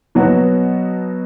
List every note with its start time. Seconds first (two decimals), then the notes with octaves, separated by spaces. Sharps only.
0.15 B2 F#3 B3 F#4